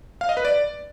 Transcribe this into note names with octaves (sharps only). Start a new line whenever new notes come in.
F5
D#5
B4
D5